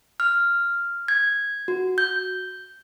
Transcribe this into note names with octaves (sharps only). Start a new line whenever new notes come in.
F6
G#6
F#4
G6